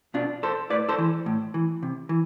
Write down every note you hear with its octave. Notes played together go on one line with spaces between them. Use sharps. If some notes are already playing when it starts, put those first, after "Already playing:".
B2 D4 F4
A4 C5
A2 B4 D5
A4 C5
E3
A2
E3
C3
E3